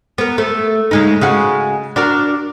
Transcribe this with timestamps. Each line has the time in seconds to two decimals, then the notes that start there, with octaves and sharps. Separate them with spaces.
0.18 B3 A#4
0.38 A3
0.91 C#3 G#3 D#4
1.21 C#3 G#3 F#4
1.96 D4 F#4 A#4